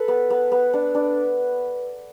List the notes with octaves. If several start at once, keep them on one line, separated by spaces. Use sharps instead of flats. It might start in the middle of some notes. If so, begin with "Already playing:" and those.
Already playing: A4 B4
B3
B3
B3
D4
D4